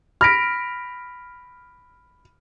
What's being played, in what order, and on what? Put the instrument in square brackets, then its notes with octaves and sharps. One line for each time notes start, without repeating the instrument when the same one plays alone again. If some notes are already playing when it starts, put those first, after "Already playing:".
[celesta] B5 A#6 B6 [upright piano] F6 D7